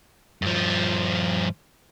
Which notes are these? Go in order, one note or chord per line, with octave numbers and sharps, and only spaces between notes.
G2 F3